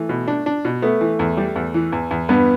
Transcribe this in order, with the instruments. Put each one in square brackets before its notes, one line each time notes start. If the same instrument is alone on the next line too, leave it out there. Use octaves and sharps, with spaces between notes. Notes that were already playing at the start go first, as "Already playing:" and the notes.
Already playing: [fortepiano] E3 [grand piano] A3
[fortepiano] B2
D4
D4
B2
[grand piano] A3 [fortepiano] B3
[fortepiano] E3
E2
G3
E2
E3
E2
E2
[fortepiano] G2 [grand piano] B3